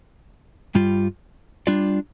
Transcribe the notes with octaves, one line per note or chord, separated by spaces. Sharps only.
G2 G3 F4
G3 D4 F4 D5